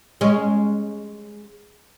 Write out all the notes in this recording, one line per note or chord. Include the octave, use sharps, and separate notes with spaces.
G#3 C#4